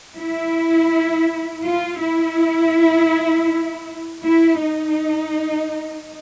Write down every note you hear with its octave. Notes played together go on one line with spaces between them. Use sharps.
E4
F4
E4
E4
D#4